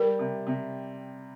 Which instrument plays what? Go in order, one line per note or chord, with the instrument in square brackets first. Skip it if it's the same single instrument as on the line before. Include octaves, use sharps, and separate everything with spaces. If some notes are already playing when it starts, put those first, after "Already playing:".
Already playing: [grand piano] G3 [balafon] A#4
[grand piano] C3
C3